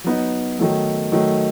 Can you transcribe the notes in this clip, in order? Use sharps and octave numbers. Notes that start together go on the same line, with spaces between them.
F#3 B3 D#4
D#3 F#3 A3
D#3 F#3 A3